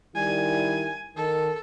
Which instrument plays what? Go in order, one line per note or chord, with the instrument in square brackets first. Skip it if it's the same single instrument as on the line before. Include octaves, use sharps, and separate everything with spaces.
[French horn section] D#3 G3 E4 [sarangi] G#5
[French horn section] D#3 [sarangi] A4